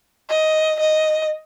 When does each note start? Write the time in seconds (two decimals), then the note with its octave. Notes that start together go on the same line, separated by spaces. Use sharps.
0.30 D#5
0.80 D#5